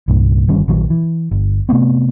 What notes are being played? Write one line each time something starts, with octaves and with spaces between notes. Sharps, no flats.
C2 G2 A#2
G1 D#3 G3 C#4
A#1 D#3 F#3
E3
G1
C3 A3 B3 C4